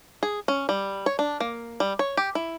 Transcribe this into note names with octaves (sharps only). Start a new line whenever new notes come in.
G#4
C#4
G3
C#5
D4
A#3
G3
C#5
G4
E4